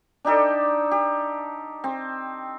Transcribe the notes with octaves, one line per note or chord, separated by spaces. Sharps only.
D4 D#4 G4 A4
G4
C4